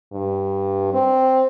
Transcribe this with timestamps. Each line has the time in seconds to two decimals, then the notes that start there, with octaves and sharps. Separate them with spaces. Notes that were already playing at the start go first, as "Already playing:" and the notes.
0.12 G2
0.94 C4